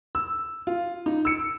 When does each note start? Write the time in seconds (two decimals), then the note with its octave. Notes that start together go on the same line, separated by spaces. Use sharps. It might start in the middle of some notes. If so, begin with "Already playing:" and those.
0.15 E6
0.67 F4
1.06 D#4
1.25 E6 C#7